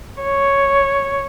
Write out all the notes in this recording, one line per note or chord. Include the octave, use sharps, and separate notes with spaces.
C#5